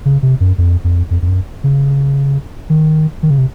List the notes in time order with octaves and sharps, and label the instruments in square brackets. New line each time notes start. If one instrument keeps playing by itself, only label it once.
[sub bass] C#3
C3
F#2
F2
F2
F2
F2
F#2
C#3
D#3
D#3
C#3
C3